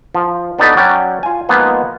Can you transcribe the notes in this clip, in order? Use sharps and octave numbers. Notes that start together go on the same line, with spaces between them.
F3
B3 D4 D#4 F#4 A4 B4
F#3 C#4 D5 G5
F4 G#5
F3 G#3 A#3 B3 D#4 F4